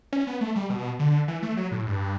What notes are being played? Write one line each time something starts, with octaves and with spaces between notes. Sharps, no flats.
C#4
B3
A3
G3
B2
D3
E3
A3
F#3
A2
G2